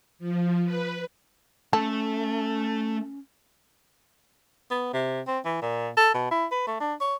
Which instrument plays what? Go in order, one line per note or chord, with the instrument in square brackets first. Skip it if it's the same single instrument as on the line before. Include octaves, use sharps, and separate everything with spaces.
[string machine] F3
B4
[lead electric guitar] A3 [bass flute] C#4 [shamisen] A4
[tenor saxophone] B3
C3
C4
E3
A#2
A4
B2
E4
B4
A3
D4
C#5